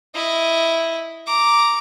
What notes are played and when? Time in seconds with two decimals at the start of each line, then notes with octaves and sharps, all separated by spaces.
0.15 E4 D#5
1.27 A#5 D6